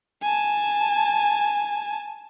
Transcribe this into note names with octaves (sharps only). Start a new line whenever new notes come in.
G#5 A5